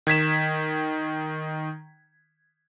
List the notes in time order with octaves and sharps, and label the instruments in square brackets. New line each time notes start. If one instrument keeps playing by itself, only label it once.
[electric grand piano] D#3 G#6 B6 E7